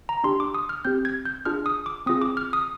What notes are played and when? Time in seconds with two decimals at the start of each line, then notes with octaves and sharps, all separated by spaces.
0.09 A#5
0.24 D4 G4 C6
0.40 D6
0.55 D#6
0.69 F6
0.85 C4 G4 G6
1.05 G#6
1.25 G6
1.45 D4 F4 G#4 F6
1.66 D#6
1.86 D6
2.06 C4 F4 G#4 D#6
2.22 D6
2.37 F6
2.53 D#6